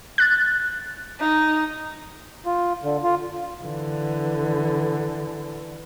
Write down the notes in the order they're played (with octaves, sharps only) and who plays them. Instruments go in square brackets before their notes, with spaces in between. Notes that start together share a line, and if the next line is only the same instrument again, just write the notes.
[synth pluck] F#6 A6
[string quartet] D#4
[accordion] F4
D3
F4
[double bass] D3 E3